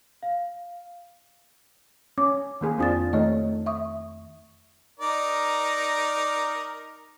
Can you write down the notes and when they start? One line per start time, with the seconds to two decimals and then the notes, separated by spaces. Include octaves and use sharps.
0.23 F5
2.18 C#4 D6
2.61 D#3 A#3 G#4
2.78 F2 C4 D4 F4 D#6 A6
3.13 D#3 A3 D#4 C#5 D#5
3.66 E5 C#6 D#6
5.00 D#4 A#4 D5